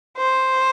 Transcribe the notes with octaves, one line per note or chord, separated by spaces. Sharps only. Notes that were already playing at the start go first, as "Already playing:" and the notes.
C5